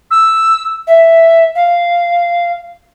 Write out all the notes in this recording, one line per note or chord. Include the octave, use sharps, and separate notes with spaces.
E6
E5
F5